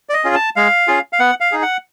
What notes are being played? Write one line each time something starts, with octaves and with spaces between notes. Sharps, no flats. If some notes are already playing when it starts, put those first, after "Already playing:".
D5
D#5
C#4 F4 G#4
A5
G#3 F5
C#4 F4 G#4
F5
B3 F#5
F5
D#4 G#4
F#5